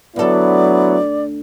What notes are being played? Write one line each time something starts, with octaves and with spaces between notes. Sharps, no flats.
D2 F#3 B3 E4 A4 D5